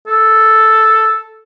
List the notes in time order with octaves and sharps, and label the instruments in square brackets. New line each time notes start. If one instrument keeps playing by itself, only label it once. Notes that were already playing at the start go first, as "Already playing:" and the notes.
[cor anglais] A4